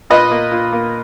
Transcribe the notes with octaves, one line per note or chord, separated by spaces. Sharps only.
A#2 B4 D#5
A#3
A#2
A#3